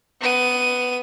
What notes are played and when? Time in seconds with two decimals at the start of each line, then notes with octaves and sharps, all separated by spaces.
0.21 B3 D#7